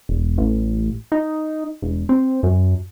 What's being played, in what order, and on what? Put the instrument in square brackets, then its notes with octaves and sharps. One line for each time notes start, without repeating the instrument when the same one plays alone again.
[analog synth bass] E1
A1
D#4
E1
C4
F#2